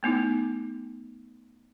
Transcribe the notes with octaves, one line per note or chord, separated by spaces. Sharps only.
A3 B3 D#4 E4